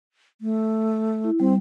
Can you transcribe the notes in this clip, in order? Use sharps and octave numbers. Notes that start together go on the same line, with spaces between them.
A3
E4
G3 C4